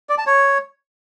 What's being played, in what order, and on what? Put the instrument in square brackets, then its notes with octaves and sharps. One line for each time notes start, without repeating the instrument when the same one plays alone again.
[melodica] D5
A5
C#5